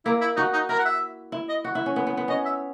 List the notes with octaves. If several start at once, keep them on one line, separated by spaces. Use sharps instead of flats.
A#3 E4
E4
D#4 F#4
D#4
E4 A#4
F#5
E5
E4
D#5
F#4
E4
C#4
B3
B3
B3
C#4 D#5
E5